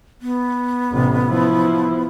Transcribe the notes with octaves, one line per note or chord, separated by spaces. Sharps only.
B3
A1 C3
F3 E4